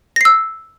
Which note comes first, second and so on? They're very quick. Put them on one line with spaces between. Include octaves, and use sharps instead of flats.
A#6 C7 E6